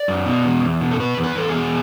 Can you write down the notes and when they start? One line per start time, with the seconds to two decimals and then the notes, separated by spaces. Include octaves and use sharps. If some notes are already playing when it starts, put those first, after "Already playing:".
Already playing: D5
0.08 F#2
0.26 B2
0.45 E2
0.63 E2
0.81 B2
0.91 A4
0.99 B2 B4
1.18 E2
1.24 B4
1.36 E2 A4
1.49 G#4
1.55 B2